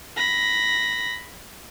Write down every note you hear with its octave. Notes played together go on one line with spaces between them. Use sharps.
B5 A#6